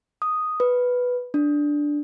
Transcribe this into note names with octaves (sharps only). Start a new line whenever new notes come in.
D#6
B4
D4